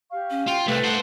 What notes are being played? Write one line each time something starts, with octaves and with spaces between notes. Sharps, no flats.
G4 F5 C#6
C#4
F4 G5
C2 A3 B4
C5 F#5